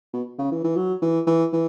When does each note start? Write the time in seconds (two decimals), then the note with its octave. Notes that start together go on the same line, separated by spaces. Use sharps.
0.14 B2
0.39 C#3
0.51 E3
0.64 E3
0.76 F#3
1.02 E3
1.27 E3
1.53 E3